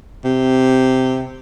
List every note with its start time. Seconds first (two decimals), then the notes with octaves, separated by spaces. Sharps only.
0.25 C3